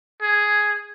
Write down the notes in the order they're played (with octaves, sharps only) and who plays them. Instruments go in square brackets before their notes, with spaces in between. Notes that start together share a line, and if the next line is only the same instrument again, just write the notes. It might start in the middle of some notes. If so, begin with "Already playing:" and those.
[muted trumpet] G#4